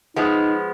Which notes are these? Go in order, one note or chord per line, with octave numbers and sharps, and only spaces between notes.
F3 G#3 B3 D#4